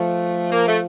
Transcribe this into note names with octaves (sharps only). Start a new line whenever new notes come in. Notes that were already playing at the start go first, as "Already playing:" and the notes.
Already playing: F3 A3
A#3
A3